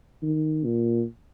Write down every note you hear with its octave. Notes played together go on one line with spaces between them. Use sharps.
D#3
A#2